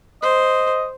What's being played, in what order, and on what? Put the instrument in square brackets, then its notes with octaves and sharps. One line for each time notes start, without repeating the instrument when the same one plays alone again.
[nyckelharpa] C5 [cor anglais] D#5